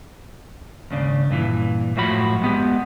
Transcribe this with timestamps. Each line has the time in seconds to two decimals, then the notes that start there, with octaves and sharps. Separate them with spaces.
0.91 D#2 G#2 C#3 D4
1.30 G2 A#2 E3
1.96 F#2 A2 F3 F#4 B5
2.42 G#3 B3 G4